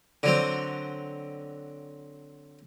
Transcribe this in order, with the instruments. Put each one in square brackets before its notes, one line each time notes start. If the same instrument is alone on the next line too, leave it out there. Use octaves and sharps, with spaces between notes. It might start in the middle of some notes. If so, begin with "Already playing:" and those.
[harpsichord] D3 F#3 C4